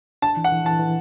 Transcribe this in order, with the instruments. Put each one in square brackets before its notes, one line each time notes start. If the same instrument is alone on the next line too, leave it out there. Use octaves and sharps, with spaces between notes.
[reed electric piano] D4 [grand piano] A5
[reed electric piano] E3
[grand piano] F#5
[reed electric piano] E3
[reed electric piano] E3 [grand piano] A5
[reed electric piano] E3